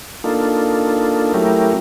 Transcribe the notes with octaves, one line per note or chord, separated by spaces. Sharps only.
A#3 D4 D#4 F4 A4
F#3 A3 C#4 E4 G4 A#4